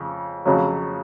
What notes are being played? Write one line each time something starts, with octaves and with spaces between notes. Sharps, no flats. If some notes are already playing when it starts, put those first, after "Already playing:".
Already playing: F2 C#3
F2 C#3 F#3